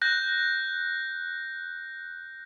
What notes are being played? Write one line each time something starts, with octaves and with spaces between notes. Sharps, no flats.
F#6 G6 A#6